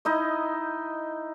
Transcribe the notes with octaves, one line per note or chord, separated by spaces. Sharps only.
D#4 E4 D#5